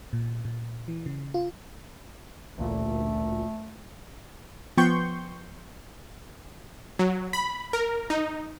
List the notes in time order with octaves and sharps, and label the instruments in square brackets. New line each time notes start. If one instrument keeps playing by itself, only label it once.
[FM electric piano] A#2
A#2
E3
C#3
F4
[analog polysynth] A1 D2 A#2 [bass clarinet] A3
[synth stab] F3 B3 G5 C6 C#6 G6
[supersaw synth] F#3
B5
A#4
D#4